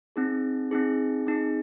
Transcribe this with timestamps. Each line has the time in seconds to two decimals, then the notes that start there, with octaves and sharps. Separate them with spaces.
0.16 C4 D#4 G#4
0.71 C4 D#4 G#4
1.26 C4 D#4 G#4